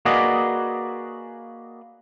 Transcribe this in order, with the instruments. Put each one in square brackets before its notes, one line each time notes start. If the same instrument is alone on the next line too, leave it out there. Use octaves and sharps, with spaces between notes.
[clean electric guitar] A#3 F#4 G#4 B4 D5 D#5